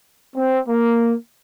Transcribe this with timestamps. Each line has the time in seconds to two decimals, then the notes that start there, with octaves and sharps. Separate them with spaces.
0.35 C4
0.68 A#3